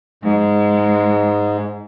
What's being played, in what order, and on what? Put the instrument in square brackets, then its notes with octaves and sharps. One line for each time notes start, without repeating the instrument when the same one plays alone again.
[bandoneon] G#2 [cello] G#3